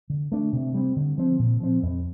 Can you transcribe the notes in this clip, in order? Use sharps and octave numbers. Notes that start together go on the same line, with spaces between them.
D3
A3 D4
C3
G3 C4
D3
F3 C4
A#2
F3 C4
F2